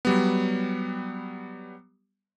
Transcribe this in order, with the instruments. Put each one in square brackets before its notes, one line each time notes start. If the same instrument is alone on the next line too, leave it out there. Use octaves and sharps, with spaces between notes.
[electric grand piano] F#3 G3 B3